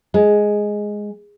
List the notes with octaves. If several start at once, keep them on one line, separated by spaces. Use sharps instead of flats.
G#3